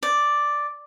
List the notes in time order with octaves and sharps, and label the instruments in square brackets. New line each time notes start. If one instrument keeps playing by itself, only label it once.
[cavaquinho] D5